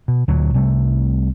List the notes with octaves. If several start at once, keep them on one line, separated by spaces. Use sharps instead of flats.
B2
D2 A#2 F#3
C2 C3 G3 A3